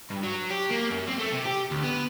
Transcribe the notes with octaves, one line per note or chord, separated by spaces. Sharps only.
G2
F#3
G4
A#3
F#2
C4
A3
C3
G4
D2
B3